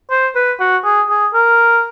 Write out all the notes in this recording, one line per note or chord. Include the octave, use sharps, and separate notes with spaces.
C5
B4
F#4
G#4
G#4
A#4